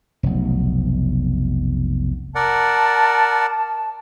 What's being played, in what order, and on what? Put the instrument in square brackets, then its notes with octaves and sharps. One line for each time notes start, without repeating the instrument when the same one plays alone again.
[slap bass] F1 B1
[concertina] A#4 D5 F#5 [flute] A5